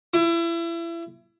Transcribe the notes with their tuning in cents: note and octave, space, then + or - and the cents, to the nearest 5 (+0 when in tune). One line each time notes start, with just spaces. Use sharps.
E4 +30